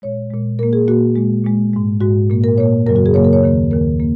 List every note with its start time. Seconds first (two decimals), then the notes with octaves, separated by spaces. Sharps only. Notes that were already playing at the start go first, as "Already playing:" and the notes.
0.02 A#2 G#3 C#5
0.31 A#2 G#3
0.59 A#2 A#3 A#4
0.73 G#4
0.88 A#2 A#3 F#4
1.16 A#2 G#3
1.45 A#2 G#3
1.73 G#2 G#3
2.01 G#2 G#3 F#4
2.30 A#2 A#3
2.44 A#4
2.58 A#2 A#3 C#5
2.86 F#2 C#3 F#3 A#3 A#4
2.96 F#4
3.06 G#4
3.14 F#2 C#3 F#3 A#3 C#5
3.25 A#4
3.33 C#5
3.43 D#2 D#3 A#3
3.71 D#2 D#3 A#3 A#4
4.00 A#3